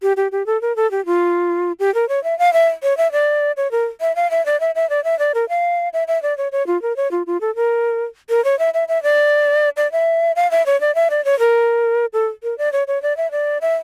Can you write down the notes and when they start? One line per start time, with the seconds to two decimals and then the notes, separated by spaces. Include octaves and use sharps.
0.02 G4
0.17 G4
0.32 G4
0.46 A4
0.61 A#4
0.76 A4
0.91 G4
1.06 F4
1.79 G4
1.94 A#4
2.09 C#5
2.24 E5
2.39 F5
2.53 E5
2.83 C#5
2.97 E5
3.12 D5
3.57 C#5
3.71 A#4
4.01 E5
4.16 F5
4.31 E5
4.46 D5
4.60 E5
4.75 E5
4.90 D5
5.04 E5
5.19 D5
5.34 A#4
5.49 F5
5.93 E5
6.08 E5
6.23 D5
6.38 C#5
6.52 C#5
6.67 F4
6.82 A#4
6.96 C#5
7.11 F4
7.27 F4
7.41 A4
7.56 A#4
8.29 A#4
8.45 C#5
8.59 E5
8.74 E5
8.88 E5
9.03 D5
9.77 D5
9.92 E5
10.36 F5
10.51 E5
10.66 C#5
10.81 D5
10.95 E5
11.10 D5
11.25 C#5
11.39 A#4
12.13 A4
12.43 A#4
12.58 D5
12.73 C#5
12.88 C#5
13.02 D5
13.17 E5
13.31 D5
13.61 E5